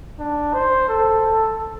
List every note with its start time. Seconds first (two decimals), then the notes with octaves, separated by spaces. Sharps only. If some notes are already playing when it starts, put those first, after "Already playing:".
0.19 D4
0.54 C5
0.89 A4